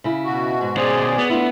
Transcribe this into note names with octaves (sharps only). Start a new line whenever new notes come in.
C#3 E4
B2 F#4
G#2
B2 G#4 C5 D5
B3 C#5
A3 D4 E4 F4